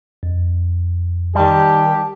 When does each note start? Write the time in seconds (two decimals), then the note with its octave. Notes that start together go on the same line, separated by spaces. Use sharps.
0.23 F2
1.35 D#3 G3 G4 A5